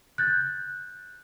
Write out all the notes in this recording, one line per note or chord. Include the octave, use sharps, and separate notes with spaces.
F#6 G6 A6